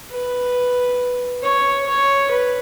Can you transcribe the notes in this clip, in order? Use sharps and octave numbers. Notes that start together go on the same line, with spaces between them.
B4
C#5
C#5
B4